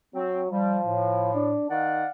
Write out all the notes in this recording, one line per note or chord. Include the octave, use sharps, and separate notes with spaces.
F#3 C4
F3 G3
A2
D4
D#3 D5 F5 F#5